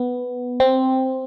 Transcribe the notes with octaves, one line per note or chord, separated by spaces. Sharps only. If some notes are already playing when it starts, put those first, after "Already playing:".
Already playing: B3
C4